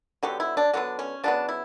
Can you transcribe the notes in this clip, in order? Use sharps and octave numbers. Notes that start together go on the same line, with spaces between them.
D3 F#3 B3 G4
E4
D4
D3 F#3 B3 D4
C#4
C#3 F#3 B3 D4
E4